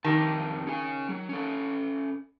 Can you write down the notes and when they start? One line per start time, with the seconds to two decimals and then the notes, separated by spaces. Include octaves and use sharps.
0.04 F2 D#3 G4 A5
0.67 C#4 G#4 G#5
1.09 F#3
1.29 C#4 A4